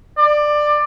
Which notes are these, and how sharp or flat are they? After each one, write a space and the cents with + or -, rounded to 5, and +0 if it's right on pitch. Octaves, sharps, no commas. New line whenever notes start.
D5 +20